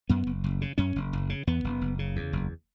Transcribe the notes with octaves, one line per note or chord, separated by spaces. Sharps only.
F#2 B3
F#1
F#1
C#3
F#2 C#4
F#1
F#1
C#3
E2 B3
F#1
F#1
C#3
E2
F#1